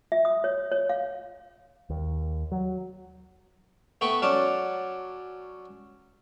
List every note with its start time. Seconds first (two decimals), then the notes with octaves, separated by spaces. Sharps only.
0.12 E5
0.25 D#6
0.44 C#5
0.72 C#5
0.89 F5
1.90 D#2
2.52 F#3
4.01 A3 B3 G5 B5 C#6
4.22 F#3 C#4 D5 F#5 A5